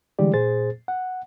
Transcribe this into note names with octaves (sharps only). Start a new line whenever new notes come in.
D3 E3 G3 G#3 G4 D5
A#2 G#4 C5 A6
F#5